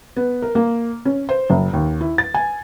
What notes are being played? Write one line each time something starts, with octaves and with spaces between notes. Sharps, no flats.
B3
A#4
A#3
C#4
C5
F#1
D#2
E4
A6
G#5